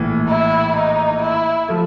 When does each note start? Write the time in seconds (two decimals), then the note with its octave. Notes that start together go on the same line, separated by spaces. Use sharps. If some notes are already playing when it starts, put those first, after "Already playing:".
Already playing: A#1 A2 E3
0.28 E4
0.76 D#4
1.22 E4
1.68 F3 A3